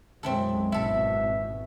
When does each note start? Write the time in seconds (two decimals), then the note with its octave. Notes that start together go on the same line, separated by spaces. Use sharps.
0.23 B1 F#2 G#3 C4 E4 A4
0.72 G#1 B2 E4 A4 E5